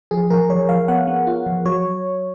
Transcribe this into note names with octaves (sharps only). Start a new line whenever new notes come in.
F3 G#4
F3 A#4
F3 C#5
F3 F5
B3 F#5
B3
F4
F3
F#3 C#5